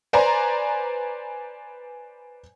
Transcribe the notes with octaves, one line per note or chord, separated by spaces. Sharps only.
B4 C5 D5 G#5 A#5